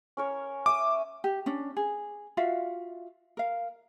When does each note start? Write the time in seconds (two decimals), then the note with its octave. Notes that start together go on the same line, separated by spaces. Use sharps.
0.17 C#4 A#4 C#5
0.66 E5 G#5 D6 D#6
1.24 G4
1.46 C#4 D4
1.77 G#4
2.37 F4 F#4 E5 F5
3.37 A#4 F5